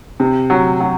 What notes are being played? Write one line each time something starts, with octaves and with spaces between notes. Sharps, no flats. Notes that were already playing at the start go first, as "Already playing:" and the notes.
C3
F#3
F#3